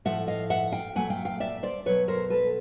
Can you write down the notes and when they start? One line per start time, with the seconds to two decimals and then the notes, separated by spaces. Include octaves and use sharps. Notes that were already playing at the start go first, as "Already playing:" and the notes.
0.05 A2 F3 A3 E5 F#5
0.28 D#5 F5
0.50 E5 F#5
0.72 F5 G5
0.95 A#2 F#3 A3 F#5 G#5
1.10 F5 G5
1.25 F5 G5
1.40 D5 E5
1.63 C5 D5
1.86 B2 F#3 A3 B4 C#5
2.08 A#4 C5
2.30 A4 B4